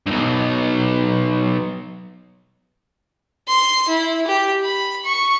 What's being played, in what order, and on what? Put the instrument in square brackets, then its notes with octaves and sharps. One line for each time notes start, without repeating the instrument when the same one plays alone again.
[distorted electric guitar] B1 G2
[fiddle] C6
E4
G4
B5
C#6